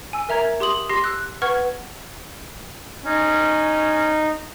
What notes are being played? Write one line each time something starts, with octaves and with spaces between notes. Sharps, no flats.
G#5 E6
A#4 E5 A#5 G#6
G4 C6 D#6 F#7
G4 C6 A#6 C7
E6 F#6
B4 F#5 C#6 F6 G#6
C#4 D#4